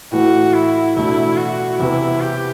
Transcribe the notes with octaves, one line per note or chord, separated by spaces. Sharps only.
A2 E3 A3 F#4
E4
E2 B2 A3 D4 E4
F#4
E2 C3 E3 B3 E4
G4